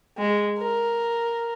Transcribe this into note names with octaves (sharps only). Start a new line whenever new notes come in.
G#3
A#4